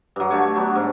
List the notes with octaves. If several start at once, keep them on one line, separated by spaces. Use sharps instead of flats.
G2 F#3
D3 A3 C#5
F#3 B3 D4
G#2